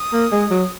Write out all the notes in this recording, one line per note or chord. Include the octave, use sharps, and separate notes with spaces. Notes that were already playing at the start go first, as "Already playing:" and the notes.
Already playing: D#6
A#3
G#3
F#3